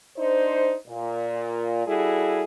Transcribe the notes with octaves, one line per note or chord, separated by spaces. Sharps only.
D4 D#4 C5
A#2
G3 E4 F#4 G#4 A4